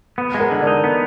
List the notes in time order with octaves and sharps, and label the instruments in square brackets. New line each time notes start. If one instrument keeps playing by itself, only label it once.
[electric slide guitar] B3
G#3
[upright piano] A#4
[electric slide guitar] D3
[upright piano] D5
[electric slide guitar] D#4
B3